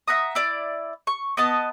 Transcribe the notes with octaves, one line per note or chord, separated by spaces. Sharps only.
E5 F#5 A#5 D#6
E4 D5
C#6
B3 D#5 A5